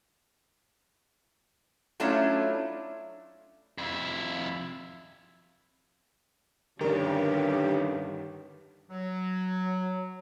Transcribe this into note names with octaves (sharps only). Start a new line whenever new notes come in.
F#3 A3 C#4 D4 E4 F4
F2 E4
G2 D3 D#3 G3 C#4 G4 A#4 D5
F#3